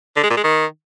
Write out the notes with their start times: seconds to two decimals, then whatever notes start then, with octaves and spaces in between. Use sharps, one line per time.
0.16 D3
0.23 G#3
0.30 A#2
0.37 G#3
0.44 D#3